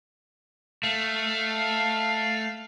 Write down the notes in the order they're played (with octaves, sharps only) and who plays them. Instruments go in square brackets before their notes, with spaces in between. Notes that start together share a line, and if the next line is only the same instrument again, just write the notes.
[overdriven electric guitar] A3 [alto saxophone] F5